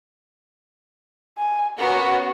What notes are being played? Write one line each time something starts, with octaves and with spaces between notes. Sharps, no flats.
G#5
A#3 B3 C#4 F#4